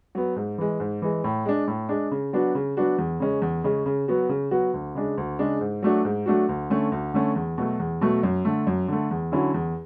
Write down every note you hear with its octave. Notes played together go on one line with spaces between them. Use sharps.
F#3 B3
G#2
E3 G#3
G#2
E3 G#3
A2
G#3 D4
A2
G#3 D4
C#3
F#3 B3 D4 F#4
C#3
F#3 B3 D4 F#4
E2
C#3 G#3 C#4
E2
C#3 G#3 C#4
C#3
F#3 B3 F#4
C#3
F#3 B3 F#4
D2
C#3 G#3 D4
D2
C#3 G#3 D4
G#2
F#3 A3 D4 F#4
G#2
F#3 A3 D4 F#4
D2
D3 A3 C#4
D2
D3 A3 C#4
E2
B2 F#3 A3
E2
B2 F#3 A3
F#2
D3 A3
F#2
D3 A3
E2
D3 F#3 C#4 E4
E2